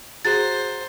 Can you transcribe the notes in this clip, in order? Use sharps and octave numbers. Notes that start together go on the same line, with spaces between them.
F#4 G#4 C5 A#5 A6